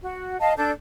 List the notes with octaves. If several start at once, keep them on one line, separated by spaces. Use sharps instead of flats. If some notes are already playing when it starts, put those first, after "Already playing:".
F#4
D#5 F5 A5
D4 A4 G6